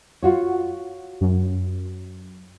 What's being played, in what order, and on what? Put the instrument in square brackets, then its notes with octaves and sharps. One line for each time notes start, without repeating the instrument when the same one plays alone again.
[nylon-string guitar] F4 F#4 C#5
[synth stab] F#2